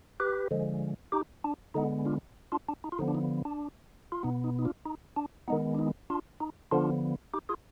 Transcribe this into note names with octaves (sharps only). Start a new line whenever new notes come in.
G4 B4
D3 F3 G#3
D#4 G4
D4
D3 G#3 B3 D#4
D4 F4
D4 F4
D4
D#4
F4
D3 F3 B3 D#4
D4
D#4
D4
F4
B2 B3 D#4
D#4
D#4
D4 F4
D#4
D4
D#3 G#3 B3 D#4
D4
D#4
D4 F4
D#4
D3 F3 B3 D4 F4
D#4 G4
F4 G#4